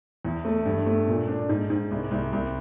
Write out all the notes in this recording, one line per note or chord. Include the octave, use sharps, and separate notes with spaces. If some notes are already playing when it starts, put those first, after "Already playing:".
E2
A3
G2
A3
A#2
D4
G#2
G#2
C2
C2
C2